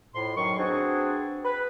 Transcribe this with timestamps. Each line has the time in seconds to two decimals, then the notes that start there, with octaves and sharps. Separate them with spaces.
0.15 F2 A2 C6
0.37 F#2 D#3 F#3 C#6
0.58 B3 C4 D4 F#4 G#4
1.45 B4